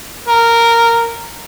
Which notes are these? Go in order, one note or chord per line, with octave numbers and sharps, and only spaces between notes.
A#4